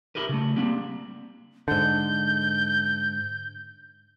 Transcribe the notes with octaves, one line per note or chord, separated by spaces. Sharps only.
E4 G4 A#4 B4
C#3 A3
G3 A#3 C4 D4
G#2 D3 G6